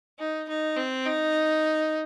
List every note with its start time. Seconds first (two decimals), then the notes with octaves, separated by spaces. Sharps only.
0.19 D#4
0.49 D#4
0.77 C4
1.06 D#4